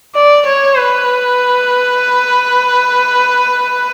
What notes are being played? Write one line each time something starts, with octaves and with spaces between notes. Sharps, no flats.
D5
C#5
B4